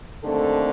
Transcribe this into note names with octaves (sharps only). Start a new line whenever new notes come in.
D#2 D3 A3 C4 A4